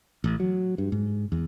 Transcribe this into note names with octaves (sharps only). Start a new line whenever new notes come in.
A1
F#3
G2
G#2
E2